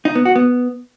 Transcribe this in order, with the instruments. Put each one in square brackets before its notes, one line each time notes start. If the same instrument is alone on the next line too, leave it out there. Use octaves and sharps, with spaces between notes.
[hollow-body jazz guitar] D#4
B3
F#4
B3